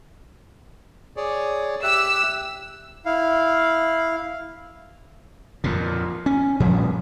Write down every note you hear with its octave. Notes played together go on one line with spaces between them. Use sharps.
G#4 C#5 D5
G4 E5 E6 F#6
E4 F5
F2 A#2
C#4
A#2 F3 G3 C#4